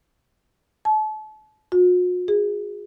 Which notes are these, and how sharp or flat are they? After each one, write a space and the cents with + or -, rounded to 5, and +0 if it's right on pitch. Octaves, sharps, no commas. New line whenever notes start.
A5 -35
F#4 -45
G#4 -15